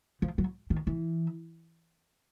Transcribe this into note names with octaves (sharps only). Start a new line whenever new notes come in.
F3
F#3
D#3
E3